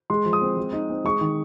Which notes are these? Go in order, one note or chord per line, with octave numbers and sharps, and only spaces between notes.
G#3 C6
F3
D#6
C4
G#3
D#4
C4
G#3 C#6
D#3